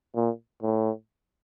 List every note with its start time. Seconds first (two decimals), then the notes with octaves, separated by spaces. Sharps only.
0.15 A#2
0.62 A2